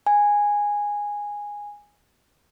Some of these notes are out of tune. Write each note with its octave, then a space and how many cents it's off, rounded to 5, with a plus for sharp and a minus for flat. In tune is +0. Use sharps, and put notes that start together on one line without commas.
G#5 -10